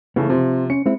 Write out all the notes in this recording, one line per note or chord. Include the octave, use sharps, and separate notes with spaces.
C#3 E3 A3 B3
C3 F3 C4
C#4 C#7
G#3 C4 E4